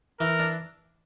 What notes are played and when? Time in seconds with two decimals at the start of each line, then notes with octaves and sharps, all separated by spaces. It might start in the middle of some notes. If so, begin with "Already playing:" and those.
0.20 E3 A#4
0.39 D4